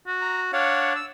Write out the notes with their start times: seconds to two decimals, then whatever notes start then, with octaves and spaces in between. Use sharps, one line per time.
0.07 F#4
0.21 A#5
0.53 D4 C#5 F5 F#5
0.96 E6